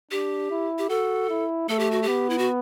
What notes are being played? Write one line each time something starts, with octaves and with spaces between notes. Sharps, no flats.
D4 G4
E4
G4
F#4 A4
E4
A3 A4
G4
F#4
G4
B3
E4
F#4